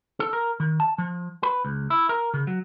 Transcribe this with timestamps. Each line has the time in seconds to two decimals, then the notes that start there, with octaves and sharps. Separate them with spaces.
0.20 A4
0.33 A#4
0.60 D#3
0.80 A5
0.98 F3
1.43 B4
1.65 C#2
1.90 E4
2.09 A#4
2.34 C#3
2.47 F#3